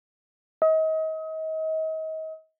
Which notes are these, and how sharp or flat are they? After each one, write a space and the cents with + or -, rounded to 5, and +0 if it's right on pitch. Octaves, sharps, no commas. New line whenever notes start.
D#5 +35